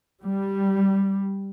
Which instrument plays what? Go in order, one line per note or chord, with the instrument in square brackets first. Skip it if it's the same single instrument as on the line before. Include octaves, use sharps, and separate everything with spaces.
[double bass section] G3